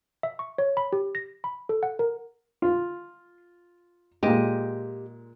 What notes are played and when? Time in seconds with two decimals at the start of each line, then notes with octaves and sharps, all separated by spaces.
0.23 E5
0.39 C#6
0.58 C#5
0.77 B5
0.93 G4
1.15 A#6
1.44 B5
1.69 A4
1.83 F#5
1.99 A#4
2.62 F4
4.23 A#2 G#3 G4 D#5